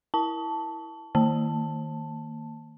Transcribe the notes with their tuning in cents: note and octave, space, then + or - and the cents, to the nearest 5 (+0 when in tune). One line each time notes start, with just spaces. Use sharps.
E4 +0 A5 +0
D#3 +0 A#3 -35 A5 +5